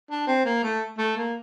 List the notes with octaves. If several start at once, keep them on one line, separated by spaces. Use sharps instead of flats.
D4
C4
A#3
A3
A3
A#3